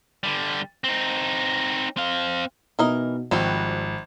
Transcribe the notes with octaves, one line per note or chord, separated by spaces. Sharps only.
D3 G3
C4 D#4
C4 F5
B2 E3 B3 D#4 A#4 D#5
G#1 F3 G3 C4 F#4